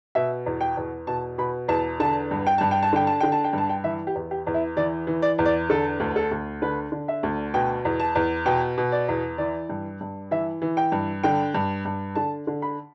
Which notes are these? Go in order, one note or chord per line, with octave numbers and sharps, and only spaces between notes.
B2 E5
E2
G5
E2
B2 A5
B2 B5
E2 A5
D3 A5
G2
G5
G2 A5
G5
A5
D3 G5
A5
D3 G5
A5
G5
G2 A5
G5
E3 E5
G4
E2
G4
E2
E4
E3 D5
E3
D5
E2
D5
D3 A4
D2
A4
D2
D3 B4
D3
E5
D2
B2 G5
E2
A5
E2
B2 G5
B2
D5
E2
E3 D5
G2
G2
E3 E5
E3
G5
G2
D3 G5
G2
G2
D3 A5
D3
B5